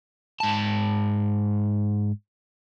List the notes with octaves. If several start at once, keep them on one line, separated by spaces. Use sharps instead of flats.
G#2 A5